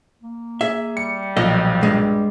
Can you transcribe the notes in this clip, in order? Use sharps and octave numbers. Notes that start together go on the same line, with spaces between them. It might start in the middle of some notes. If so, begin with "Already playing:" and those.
A#3
G#4 E5
G3 C#7
B1 A#2 F3 D#5
G2 G#3